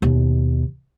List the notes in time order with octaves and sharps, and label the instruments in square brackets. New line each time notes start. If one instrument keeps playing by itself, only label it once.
[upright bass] D#2 B2